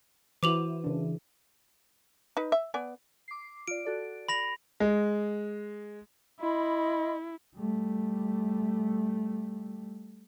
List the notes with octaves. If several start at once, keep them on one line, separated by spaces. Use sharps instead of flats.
E3 E4 F#4 C5 D6 F7 F#7
C#3 D4
D#4 B4
E5
B3 D5 G#5
D6 C7
F4 D5 D7
F#4 A4 D5
B5 A#6 F7
G#3
E4 D#5 B5 C6
G3 A3